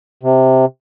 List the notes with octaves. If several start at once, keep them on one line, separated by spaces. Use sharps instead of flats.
C3